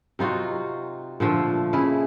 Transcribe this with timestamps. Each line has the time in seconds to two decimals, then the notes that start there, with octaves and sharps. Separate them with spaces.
0.19 C3 D#4 F4 F#4
1.20 A#2 D3 F3 A3
1.73 C#3 E4 G#4